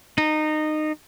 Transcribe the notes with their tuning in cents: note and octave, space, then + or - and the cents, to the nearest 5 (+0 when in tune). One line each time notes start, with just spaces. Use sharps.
D#4 -20